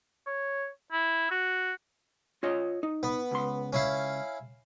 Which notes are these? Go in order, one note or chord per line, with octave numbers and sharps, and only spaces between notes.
C#5
E4
F#4
F4 C#5 D#5
D#4
B3
C#2 C6
C#4 E4 F5